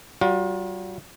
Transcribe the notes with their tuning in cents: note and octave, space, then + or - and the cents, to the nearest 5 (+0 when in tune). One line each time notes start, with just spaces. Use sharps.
G3 -40 F4 +40